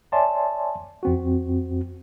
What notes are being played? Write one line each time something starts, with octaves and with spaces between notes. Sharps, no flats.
C#5 D5 E5 G#5 A5 C6
F2 C4 F#4